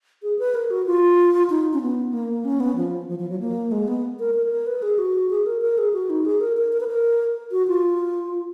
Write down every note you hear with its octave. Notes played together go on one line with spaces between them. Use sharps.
G#4
B4
A#4
F#4
F4
D#4
C#4
B3
A#3
C#4
B3
F3
F3
F3
F#3
A#3
G#3
B3
A#4
A#4
B4
G#4
F#4
G#4
A#4
A#4
G#4
F#4
D#4
G#4
A#4
A#4
A#4
B4
A#4
F#4
F4